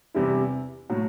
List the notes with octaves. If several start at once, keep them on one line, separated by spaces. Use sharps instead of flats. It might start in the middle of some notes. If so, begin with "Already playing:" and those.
E2 C3 G3 C4 E4
A2 F#3